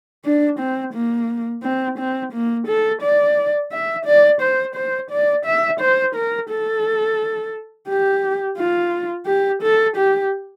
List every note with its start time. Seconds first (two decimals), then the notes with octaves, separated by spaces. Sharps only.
0.25 D4
0.59 C4
0.94 A#3
1.63 C4
1.99 C4
2.33 A#3
2.67 A4
3.02 D5
3.72 E5
4.06 D5
4.41 C5
4.75 C5
5.10 D5
5.46 E5
5.80 C5
6.15 A#4
6.50 A4
7.88 G4
8.58 F4
9.27 G4
9.63 A4
9.97 G4